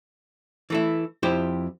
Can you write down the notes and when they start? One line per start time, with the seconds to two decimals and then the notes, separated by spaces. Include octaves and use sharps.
0.70 E3 A3 E4
1.23 F2 E4 G4 C5